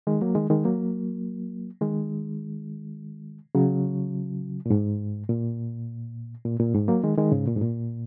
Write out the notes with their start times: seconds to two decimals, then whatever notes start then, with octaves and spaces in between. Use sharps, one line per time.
0.07 D#3 G#3
0.21 F#3 A#3
0.35 D#3 G#3
0.50 D#3 G#3
0.65 F#3 A#3
1.81 D#3 G#3
3.55 C#3 F#3
4.66 A#2
4.70 G#2
5.29 A#2
6.45 A#2
6.60 A#2
6.74 G#2
6.88 F#3 A#3
7.03 D#3 G#3
7.18 D#3 G#3
7.32 G#2 C#3
7.47 A#2
7.56 G#2
7.61 A#2